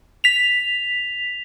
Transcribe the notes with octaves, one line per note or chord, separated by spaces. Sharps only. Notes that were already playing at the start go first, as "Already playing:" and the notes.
B6 F7